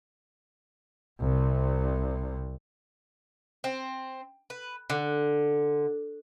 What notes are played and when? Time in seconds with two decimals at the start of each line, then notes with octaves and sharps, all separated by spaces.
1.21 C2 C3
3.64 C4
4.50 B4
4.90 D3